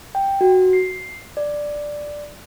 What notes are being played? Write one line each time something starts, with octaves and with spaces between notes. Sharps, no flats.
G5
F#4
C7
D5